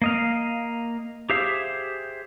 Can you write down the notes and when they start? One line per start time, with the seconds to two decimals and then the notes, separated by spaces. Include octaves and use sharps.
0.02 A#3 D#5 F5
1.30 G4 G#4 C5 E5 F5